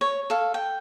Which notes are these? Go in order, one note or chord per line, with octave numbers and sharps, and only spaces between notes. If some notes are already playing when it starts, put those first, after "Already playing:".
C#5
A4 F5
G5